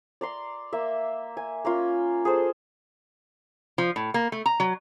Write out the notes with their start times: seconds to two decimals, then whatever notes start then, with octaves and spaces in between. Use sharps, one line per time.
0.21 D5 A#5 C6
0.73 A#3 E5
1.37 G#5
1.65 A#3 C#4 F4
2.25 G#4 A4 C5
3.78 F3
3.96 A2
4.14 A#3
4.32 A3
4.46 A#5
4.60 F#3